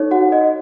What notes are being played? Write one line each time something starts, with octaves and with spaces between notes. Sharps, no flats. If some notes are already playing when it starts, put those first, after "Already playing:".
Already playing: D#4 A4 C#5
F#4 F#5
D#5